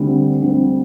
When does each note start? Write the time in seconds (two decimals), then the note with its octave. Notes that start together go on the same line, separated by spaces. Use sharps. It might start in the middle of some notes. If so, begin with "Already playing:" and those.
Already playing: D2 D3 G3 C4
0.42 D2 D3 G3 C4